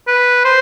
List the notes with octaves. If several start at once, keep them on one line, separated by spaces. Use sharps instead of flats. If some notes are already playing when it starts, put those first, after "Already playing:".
B4
C5